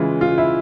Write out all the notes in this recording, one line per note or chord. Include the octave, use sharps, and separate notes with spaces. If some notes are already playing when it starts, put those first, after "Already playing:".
Already playing: C#3 E3 G#3 F4
F4
E4